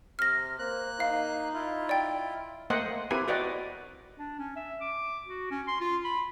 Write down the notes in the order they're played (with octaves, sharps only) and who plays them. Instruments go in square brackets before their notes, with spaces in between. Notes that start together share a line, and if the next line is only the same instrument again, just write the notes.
[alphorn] C3 [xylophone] F6 A#6
[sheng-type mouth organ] A#3 F#6 [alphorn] C5
[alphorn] D#4 [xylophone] F5
[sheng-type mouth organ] E4 F4
[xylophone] D5 G5
[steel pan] A3 A#3 C5 D#5 F#5 G5
C4 E4 G4 A#4 B4 G#5
F#4 B4 D5 D#5 G5
[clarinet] D4
C#4
E5
D6
F#4
C#4
C6
F4
B5